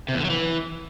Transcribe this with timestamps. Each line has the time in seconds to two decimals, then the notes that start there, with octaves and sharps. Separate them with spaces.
0.09 C3
0.14 E2
0.19 D3
0.25 F#3
0.30 E3